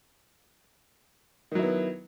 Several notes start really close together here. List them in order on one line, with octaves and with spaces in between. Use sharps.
D#3 F#3 E4 B3